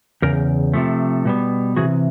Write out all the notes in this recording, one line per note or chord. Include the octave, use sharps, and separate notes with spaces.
E2 C#3 A#4
C3 F3 A3
B2 G3 B3
C3 E3 F#4 G#4